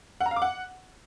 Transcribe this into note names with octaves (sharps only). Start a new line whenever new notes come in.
F#5
A#5
F5
D6
F#5